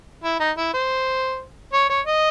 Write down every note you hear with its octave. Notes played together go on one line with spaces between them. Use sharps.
E4
D#4
E4
C5
C#5
C#5
D#5